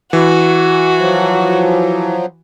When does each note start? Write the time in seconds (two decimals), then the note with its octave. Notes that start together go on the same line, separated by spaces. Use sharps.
0.13 E3 F#4
0.99 F3 F#3